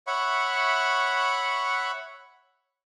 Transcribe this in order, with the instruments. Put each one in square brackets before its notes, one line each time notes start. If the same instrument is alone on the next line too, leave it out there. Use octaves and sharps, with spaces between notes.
[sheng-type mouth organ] C#5 E5 F#5 B5 C#6